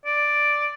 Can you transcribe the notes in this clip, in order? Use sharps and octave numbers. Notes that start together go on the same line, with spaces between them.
D5